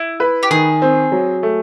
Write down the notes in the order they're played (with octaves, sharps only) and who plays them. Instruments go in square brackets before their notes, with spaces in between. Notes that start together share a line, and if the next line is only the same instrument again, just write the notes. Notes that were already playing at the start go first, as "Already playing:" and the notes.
Already playing: [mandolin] E4
[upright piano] B4
[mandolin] G4
[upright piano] D#3 [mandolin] G#4
[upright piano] C4
F#3
A3